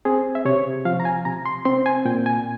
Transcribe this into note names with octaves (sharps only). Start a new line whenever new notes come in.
C4 G#4
E5
C3 C#5
F3 F5
A#5
G#5
C3 A#5
C6
C4 C6
G#5
A#2 G5
G#5